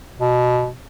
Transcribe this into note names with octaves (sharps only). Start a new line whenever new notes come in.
B2